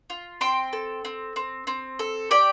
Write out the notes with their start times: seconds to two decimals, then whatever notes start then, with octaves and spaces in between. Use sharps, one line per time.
0.10 F4
0.41 C4 G5 C6
0.73 A4
1.05 C4
1.36 C4
1.67 C4
1.99 A4
2.31 G4 D5 G5